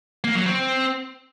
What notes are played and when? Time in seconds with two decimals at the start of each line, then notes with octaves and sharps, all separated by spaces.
0.24 A#3
0.35 F#3
0.46 C4